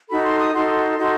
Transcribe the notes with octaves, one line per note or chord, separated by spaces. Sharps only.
D#4 F#4 A4 B5
C6
D#6
D#4 F#4 A4 C6
D#4 F#4 A4